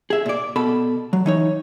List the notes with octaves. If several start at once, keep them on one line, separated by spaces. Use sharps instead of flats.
G#4 E5
A#2 D5
B2 A4 B5
F#3
E3 D#4 C#5